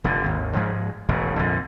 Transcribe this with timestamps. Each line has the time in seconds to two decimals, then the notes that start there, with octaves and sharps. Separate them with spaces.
0.04 F1 G2 D3
0.24 G#1 D#2
0.54 G#2 F3 G#3
1.09 E1 A1 G#2 C#3
1.39 A#1 F2 G#2 D3